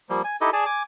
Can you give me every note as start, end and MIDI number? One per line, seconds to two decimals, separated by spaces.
0.09 0.22 53
0.09 0.22 55
0.09 0.22 58
0.24 0.36 80
0.41 0.50 63
0.41 0.50 64
0.41 0.50 67
0.41 0.50 69
0.41 0.50 75
0.53 0.65 68
0.53 0.65 74
0.53 0.65 80
0.53 0.65 81
0.66 0.83 80
0.66 0.83 86